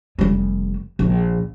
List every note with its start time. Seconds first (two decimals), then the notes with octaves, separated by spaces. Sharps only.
0.19 F1 G3
0.99 A#1